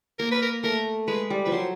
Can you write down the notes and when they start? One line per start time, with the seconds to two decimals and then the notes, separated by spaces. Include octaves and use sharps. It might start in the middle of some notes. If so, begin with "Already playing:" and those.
0.19 A#3 A#4
0.32 B4
0.42 A#4
0.64 A3 A#4
1.08 G#3 B4
1.30 G3
1.45 F3 B4
1.52 F#3 C5